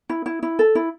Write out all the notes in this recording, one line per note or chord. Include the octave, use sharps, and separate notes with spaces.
E4
E4
E4
A4
E4